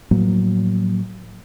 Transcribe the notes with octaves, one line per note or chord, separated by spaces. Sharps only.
A2 F3 F#3 A#3